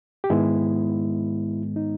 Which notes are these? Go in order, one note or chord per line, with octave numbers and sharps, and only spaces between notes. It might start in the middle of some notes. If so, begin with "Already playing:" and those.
G4
G#2 D#3 G#3 B3 E4
D#4